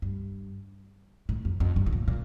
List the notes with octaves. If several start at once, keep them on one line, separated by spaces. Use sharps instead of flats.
G2
A2
F2
F2
G2
A2
A#2
A#2